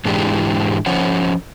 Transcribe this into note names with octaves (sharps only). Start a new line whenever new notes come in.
G#2 E3 G#3 D4 E4 G4
F3 C#4 C5 C#5 F#5